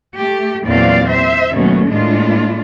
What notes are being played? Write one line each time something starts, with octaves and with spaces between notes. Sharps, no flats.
A3 G4
E2 A#2 F#3 C4 D5 F5
C5 E5
D#2 B2 F#3 A3 A#3 C#4
A2 G#3 A#3 D4 F4